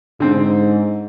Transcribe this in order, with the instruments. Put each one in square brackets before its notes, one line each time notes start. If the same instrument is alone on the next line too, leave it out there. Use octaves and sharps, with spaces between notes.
[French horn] G#2 [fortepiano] D3 C4